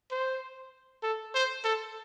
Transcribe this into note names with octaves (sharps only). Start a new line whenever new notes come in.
C5
A4
C5
A4